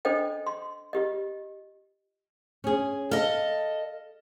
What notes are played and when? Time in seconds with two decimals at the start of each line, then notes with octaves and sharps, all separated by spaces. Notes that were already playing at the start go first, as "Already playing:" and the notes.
0.05 D4 F4 A4 C5 D#5 G5
0.47 C6
0.93 F4 G4 D#5
2.64 C#4 G#4
3.11 A4 D#5 F5